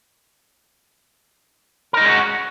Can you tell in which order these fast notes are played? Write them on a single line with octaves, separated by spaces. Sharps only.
A#4 D#4 G#3 C#4 F#4